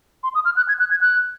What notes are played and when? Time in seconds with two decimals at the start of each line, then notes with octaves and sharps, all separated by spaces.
0.23 C6
0.35 D#6
0.45 F6
0.56 F#6
0.68 G#6
0.79 F#6
0.91 G#6
1.01 F#6